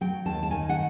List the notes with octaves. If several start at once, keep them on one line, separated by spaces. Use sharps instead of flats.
F#3 G5
D#2 A5
A5
D#3 G#5
F#5